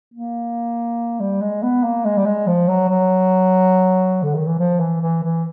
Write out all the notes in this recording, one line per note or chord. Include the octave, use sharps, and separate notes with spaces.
A#3
G3
G#3
B3
A#3
G#3
G3
G#3
F3
F#3
F#3
D3
D#3
E3
F3
E3
E3
E3